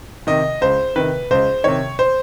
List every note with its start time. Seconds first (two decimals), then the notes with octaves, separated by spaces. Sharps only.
0.27 C3 D#3 D#5
0.61 C#2 C5
0.96 C3 D#3 B4
1.31 C#2 C5
1.64 C3 D#3 C#5
1.99 C5